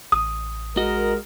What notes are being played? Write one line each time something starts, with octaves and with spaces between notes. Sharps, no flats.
A1 D#6
G#3 F#4 A#4 D#5